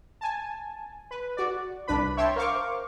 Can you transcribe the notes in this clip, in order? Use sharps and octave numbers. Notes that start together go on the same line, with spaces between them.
G#5 A5
B4
F#4 D5
C2 D4 B4 B5
C#5 E5 G5 A5 C6 C#6
A#4 C5 F5 C#6 D6